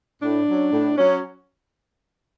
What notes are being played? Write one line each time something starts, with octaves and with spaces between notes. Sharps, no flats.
A2 D4
F#3 C#4
A2
F#3 C#4